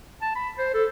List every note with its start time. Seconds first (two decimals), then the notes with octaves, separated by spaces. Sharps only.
0.22 A5
0.35 B5
0.58 C5
0.74 A4